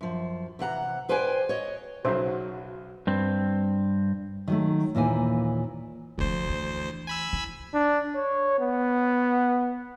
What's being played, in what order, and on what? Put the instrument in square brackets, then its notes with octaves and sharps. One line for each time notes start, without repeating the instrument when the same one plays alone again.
[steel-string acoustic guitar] F#2 F3
C3 E3 F#5 A#5
G#4 B4 C5 D5 G5 G#5
C#5 D#5
[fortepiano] B1 C#3 F#3 [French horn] F#4 [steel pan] C5 E5
[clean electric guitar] G2 C4
[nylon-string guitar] D#3 F#3 A3
D#2 A#2 E3 A#3 G#5
[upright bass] F1 F3 [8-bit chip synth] D2 C5
[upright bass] E3
[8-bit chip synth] G#5 B5 E6
[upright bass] E4
[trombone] D4
C#5
B3